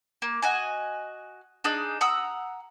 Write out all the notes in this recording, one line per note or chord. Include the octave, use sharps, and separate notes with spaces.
A#3
F#4 D#5 G#5
D4 D#4 G#4
F#5 A#5 D#6 E6